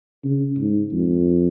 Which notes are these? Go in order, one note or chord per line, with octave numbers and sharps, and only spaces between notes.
C#3
G#2
F2